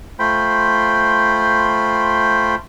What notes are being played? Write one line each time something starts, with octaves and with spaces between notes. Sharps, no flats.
A3 F4 C5 G5 B5